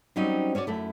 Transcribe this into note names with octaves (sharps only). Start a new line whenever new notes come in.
F#3 G3 C4 C#4 D#4
C#4 F#4 C#5 D5
F#2 A3 E4